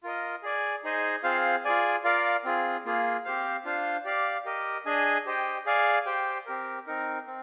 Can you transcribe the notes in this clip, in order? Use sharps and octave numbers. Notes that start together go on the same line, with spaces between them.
F4 A#4 D#5
G#4 D5 G#5
D#4 G#4 C5 D#5 G#5
C4 F4 G#4 C5 F5
F4 G#4 D5 G#5
F4 A#4 D5 F5
C4 F4 G#4
A#3 F4 G#4
C4 G4 C5 F5
D4 F4 C5 F5
G4 D5 F5
G4 A#4 D#5
D4 G#4 D#5 G#5
G4 C5 D#5 G5
G#4 D5 F5 G#5
G4 C5 G5
C4 G4 A#4
C4 D#4 A#4
C4